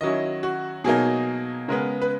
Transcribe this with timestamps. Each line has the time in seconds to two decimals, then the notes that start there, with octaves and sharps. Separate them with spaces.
0.01 D#3 F#3 C#4 E4 D#5
0.43 F#4
0.84 B2 F#3 A#3 D#4 G#4
1.68 C#3 G#3 B3 A#4
2.02 B4